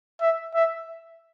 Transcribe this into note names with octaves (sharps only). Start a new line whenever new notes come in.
E5
E5